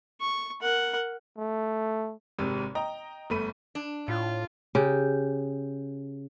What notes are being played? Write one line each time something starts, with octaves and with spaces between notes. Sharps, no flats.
C#6
A#4 F#5
A3
G#1 G#2 C3
D#5 G5 A#5
G1 A3 B5 D#7
D4
A2 F4
C#3 G4